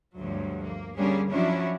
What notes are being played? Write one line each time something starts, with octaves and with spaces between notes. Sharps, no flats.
D2 G2 F3 F#3
A#3
D3 G3 A#3 C#4 D4 G#4
F3 F#3 C#4 D4 E4 F#4